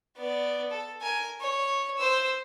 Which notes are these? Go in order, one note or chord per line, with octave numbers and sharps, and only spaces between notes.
B3 D5
A4
A#4 G#5
C#5
C5 E6